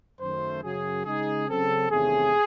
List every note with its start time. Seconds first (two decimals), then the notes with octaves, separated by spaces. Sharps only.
0.19 F#2 D#3 A3 C5
0.63 F#2 C#3 F#3 G#4
1.05 C#3 G#3 D#4 G#4
1.48 C#3 F#3 C4 A4
1.90 E2 C3 D#3 A3 C#4 G#4